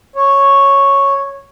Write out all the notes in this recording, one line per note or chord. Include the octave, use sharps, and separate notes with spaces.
C#5